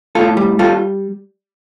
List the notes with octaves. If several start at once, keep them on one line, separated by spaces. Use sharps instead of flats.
A2 F4 A4
G3
G3 F4 A4